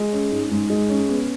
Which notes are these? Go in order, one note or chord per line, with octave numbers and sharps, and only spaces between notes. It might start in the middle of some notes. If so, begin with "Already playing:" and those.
Already playing: G#3
C#4
G#2
G#2
G#3
C#4
B3